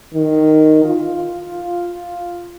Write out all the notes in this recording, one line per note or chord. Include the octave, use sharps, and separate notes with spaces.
D#3
F4